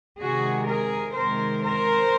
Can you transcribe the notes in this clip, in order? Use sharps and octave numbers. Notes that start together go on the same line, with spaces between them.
C3 D#3 G#3 F#4 G#4
G#4 A#4
C3 D#3 G#3 A#4 C5
A#4 C5